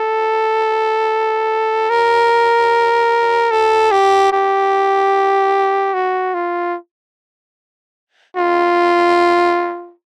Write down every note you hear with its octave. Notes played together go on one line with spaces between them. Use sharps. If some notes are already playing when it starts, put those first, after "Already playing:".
Already playing: A4
A#4
A4
G4
G4
F#4
F4
F4